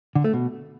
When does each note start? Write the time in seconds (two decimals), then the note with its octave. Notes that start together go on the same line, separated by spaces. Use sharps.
0.16 D3
0.24 A3
0.33 B2